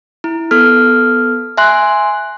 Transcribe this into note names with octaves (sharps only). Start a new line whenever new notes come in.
E4
B3 A4 F6
E5 G#5 C6 F#6